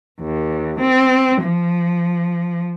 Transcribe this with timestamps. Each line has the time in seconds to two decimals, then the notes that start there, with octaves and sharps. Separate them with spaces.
0.20 D#2
0.79 C4
1.42 F3